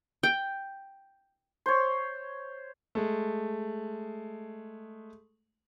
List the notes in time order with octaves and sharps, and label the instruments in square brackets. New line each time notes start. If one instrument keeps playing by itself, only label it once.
[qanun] G5
[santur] C5 C#5
[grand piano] G#3 A3